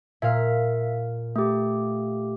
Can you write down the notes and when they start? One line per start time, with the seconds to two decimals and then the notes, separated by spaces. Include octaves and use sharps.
0.22 A#2 E5 F5
1.36 A3 G4